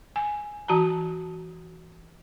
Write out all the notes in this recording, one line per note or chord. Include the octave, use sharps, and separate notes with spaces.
G#5
E3 F#4 A5 A#5